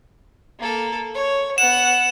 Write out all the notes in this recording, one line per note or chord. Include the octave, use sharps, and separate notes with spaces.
A#3 A4
C#5
B3 F#5 E7